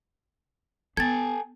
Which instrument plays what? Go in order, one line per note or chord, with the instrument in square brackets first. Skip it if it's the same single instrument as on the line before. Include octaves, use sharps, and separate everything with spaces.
[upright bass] B3 [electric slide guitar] A4 G5 G#5 [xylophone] G#6 A6